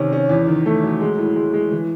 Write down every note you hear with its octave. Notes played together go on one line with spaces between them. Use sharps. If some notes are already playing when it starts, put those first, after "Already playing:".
Already playing: C3 D#3 C#4
C#4
E2
D#3
A3
F#3
G#3
A2
G#3
G#3
E3